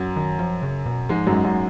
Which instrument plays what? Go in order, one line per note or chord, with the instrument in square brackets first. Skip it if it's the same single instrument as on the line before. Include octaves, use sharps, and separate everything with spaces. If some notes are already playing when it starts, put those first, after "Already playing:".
Already playing: [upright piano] F#2 F#3
[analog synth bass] D#3
F3
C#3
B2
[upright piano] G#2 G#3 [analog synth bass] F3
[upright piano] F#2 F#3
[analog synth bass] G#3
[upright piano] F#2 F#3